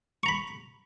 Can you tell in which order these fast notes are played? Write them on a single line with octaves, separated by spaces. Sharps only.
C#6 A#5 B5